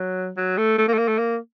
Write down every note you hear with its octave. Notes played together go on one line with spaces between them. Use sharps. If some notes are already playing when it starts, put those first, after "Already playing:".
Already playing: F#3
F#3
A3
A3
A#3
A3
A#3
A3
A#3